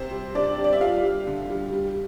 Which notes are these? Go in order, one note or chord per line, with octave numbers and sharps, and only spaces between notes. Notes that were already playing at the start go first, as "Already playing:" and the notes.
Already playing: C3 C4 C5
G3
C3 D4 D5
G3
D5
E5
G3 F4 F5
G3
D3
G3
G3